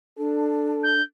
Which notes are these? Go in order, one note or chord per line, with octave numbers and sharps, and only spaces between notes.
D4 A4
G6